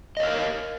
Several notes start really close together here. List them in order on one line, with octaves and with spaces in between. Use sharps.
D#5 C#5 F5 A#4